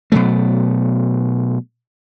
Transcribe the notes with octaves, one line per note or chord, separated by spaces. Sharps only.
B2 F#3 A3